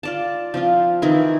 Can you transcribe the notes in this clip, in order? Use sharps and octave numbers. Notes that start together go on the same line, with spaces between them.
F4 D5 A5
F3 C4 F4
D#3 E3 C4 E4